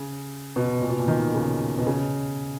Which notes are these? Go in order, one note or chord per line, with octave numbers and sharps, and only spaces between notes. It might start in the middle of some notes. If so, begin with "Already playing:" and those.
Already playing: C#3
B2
A#2
B2
A#2
D#3
C#3
B2
C#3